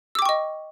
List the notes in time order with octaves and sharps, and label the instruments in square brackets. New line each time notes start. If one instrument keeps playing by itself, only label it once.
[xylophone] E6
D6
G5
C#6
D#5